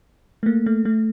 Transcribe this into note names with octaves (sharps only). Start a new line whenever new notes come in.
A3
A#3
A3
A3